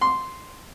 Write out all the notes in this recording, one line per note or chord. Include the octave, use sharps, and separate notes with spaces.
C6